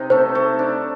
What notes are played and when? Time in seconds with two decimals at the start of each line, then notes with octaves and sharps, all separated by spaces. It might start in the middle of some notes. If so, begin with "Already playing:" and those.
Already playing: C3 D#4
0.10 A3 C5
0.35 A3
0.59 D4